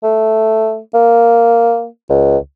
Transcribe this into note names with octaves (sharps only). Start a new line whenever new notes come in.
A3
A#3
C#2